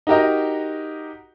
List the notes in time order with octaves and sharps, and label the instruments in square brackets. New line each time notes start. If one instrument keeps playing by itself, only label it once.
[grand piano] D#4 F#4 G4 A#4 D#5